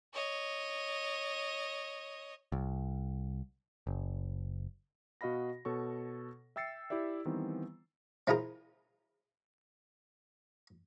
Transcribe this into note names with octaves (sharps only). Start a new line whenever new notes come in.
C#5 D#5
C2
F#1
B2 F#4 D#5 F5 B5 A#6
B2 A4 C#5 C#6
E5 G5 E6 A6 C7 C#7
E4 G4 D5 E5
D#3 E3 G3 B3 C4
C4 E4 F4 G#4 A#4